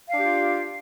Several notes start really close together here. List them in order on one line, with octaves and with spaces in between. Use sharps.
F5 D4 G4 F4